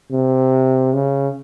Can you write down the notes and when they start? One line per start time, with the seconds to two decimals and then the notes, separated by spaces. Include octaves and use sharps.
0.12 C3
0.93 C#3